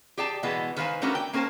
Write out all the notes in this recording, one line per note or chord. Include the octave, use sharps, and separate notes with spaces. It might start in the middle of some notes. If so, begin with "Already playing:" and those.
G4 G#4 D5 G5 A5
B2 E3 G#3 B3
D#3 B4 C5 F5 G#5
A3 B3 C#4 D4 F#4 A#4
G5
A#3 C#4 A#4 C5 A5